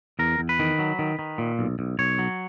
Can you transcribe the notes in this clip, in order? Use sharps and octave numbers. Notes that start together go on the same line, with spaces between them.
E2 A#4
E2
B4
D#3
F#3
D#3
D#3
A#2
B1
B1
B1 C#5
F#3